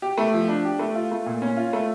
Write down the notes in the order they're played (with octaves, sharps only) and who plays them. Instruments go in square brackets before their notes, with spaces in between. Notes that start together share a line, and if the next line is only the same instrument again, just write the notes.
[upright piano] G4
A3
F3
D4
G4
A3
F4
A3
A#2
C#4
F4
A3